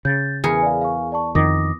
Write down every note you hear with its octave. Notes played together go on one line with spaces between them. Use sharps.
C#3 G6 A6
E2 G#4 A#4 C#7
D5 F5
F5 G#5 C#6
D5 A5 C#6
F2 D#3 D6 D#6 A#6